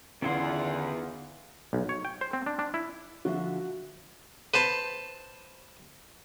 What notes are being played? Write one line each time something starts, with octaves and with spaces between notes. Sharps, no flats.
E2 D3 D#3 C#4 E4 F4 F#5 C6
B1
C#5
G5
C5
C4
D4
D4
E4
D3 F3 F#4 E5
B4 C5 A5